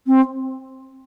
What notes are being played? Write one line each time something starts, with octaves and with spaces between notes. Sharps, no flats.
C4